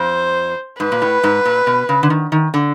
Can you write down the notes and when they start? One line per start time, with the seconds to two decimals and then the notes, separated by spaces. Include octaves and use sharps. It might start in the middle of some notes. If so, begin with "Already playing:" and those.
Already playing: F2 C5
0.80 G#2 B4
0.92 A#2
1.02 A2
1.23 G#2
1.45 A#2
1.67 B2
1.89 C#3
2.03 D3
2.10 D#3
2.32 D#3
2.54 D3